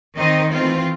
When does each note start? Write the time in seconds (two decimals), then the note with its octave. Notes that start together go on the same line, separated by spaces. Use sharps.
0.17 D#3 C4 D#4 D#5
0.52 E3 A3 C4 F4